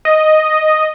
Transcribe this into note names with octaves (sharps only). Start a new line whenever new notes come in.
D#5